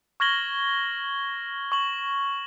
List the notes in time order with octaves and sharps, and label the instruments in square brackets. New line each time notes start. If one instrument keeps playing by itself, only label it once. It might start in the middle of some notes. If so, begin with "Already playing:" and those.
[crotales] C#6 F6 G#6 A#6 F#7 G7
C#6 F#7